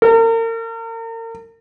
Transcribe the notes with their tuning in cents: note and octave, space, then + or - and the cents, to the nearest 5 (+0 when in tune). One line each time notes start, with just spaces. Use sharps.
A#4 -40